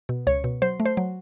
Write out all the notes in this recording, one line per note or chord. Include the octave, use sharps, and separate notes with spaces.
B2
C#2 C#5
B2
F#3 C5
A3
C5
F#3